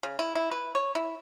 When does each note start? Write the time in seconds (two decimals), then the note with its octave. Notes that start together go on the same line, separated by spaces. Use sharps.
0.03 C#3
0.19 E4
0.35 E4
0.51 B4
0.75 C#5
0.95 E4